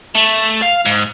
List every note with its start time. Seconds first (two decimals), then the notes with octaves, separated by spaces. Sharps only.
0.15 A3
0.62 F5
0.86 G#2